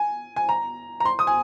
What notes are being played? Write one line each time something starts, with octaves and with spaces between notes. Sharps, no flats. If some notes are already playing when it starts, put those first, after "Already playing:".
Already playing: G#5
G#5
A#5
A#5
C6
D#6
G#5